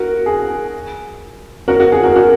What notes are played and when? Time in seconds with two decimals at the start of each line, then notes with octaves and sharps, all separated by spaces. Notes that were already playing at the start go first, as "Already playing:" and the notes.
Already playing: F#4 A#4
0.26 G#4
1.68 F#4 A#4
1.80 F#4
1.92 G#4
2.03 F#4 A#4
2.15 F#4 A#4